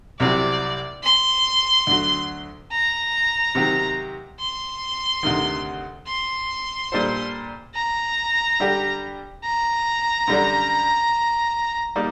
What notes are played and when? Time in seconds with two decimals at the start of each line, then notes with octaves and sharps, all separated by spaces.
0.19 C2 C3 F#3 C4 D5
1.03 C6
1.87 D2 D3 F#3
2.72 A#5
3.55 C3 D#3 F#3 C4 G4
4.40 C6
5.23 D2 C3 D#3
6.07 C6
6.92 A#2 G3 D4 A4 C5
7.75 A#5
8.60 D3 G3 D4 G4
9.44 A#5
10.27 F#2 D3 G3 D4
11.96 G3 A#3 D#4 D5